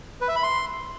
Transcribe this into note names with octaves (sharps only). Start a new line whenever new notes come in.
B4
E5
B5
C6